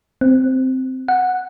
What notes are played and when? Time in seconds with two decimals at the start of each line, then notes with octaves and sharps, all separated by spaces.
0.21 C4
1.08 F#5